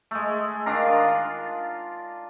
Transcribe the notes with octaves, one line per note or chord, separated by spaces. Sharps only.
G#3 A3
D#3 D4 F5 A#5
F4